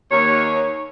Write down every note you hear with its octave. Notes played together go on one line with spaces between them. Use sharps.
D#2 C#5